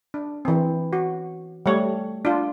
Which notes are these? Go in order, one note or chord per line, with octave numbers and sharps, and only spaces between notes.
D4
E3 C4
F#4
G3 A3 C#5
D4 F4